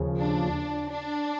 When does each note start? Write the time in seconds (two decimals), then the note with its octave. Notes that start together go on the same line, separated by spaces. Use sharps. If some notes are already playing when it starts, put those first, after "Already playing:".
Already playing: D#2 C#3 F3
0.19 D4
0.91 D4